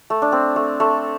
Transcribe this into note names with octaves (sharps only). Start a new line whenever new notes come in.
A3
D4
C4
A3
A3